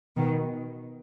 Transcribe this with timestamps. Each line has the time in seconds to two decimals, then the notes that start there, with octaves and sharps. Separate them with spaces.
0.17 B2 D#3